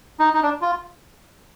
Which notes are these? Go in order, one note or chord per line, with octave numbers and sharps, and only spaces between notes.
D#4
D#4
D4
F4